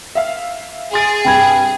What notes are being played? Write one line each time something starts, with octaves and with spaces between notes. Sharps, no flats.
E5 F5
G#4 C6 A6 D7
G2 C3 G5 B5 G#6